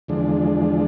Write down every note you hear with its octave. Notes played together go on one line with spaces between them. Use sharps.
E2 D3 F3 G#3 D4